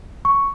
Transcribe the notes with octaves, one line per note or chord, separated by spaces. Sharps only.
C#6